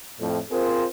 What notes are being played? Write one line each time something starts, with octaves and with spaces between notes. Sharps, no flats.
F2 A2
C4 F4 G#4 A#4 C5